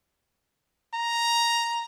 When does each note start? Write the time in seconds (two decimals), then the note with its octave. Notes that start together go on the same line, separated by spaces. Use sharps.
0.95 A#5